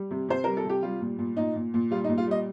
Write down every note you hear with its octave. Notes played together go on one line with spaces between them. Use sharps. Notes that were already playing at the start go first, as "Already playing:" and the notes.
Already playing: G3
C3
C3 C5
G3 A#4
A4
C3 G4
G3 F4
A#2
A#2
A#2 D#4
A#2
A#2
G3 F4
D#4
A#2
F4
G3 D#5